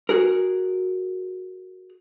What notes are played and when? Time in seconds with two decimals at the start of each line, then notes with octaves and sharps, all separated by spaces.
0.09 F#4 G#4 A#4